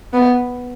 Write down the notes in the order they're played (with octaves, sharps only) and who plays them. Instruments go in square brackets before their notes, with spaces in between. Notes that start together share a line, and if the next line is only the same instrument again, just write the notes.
[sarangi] B3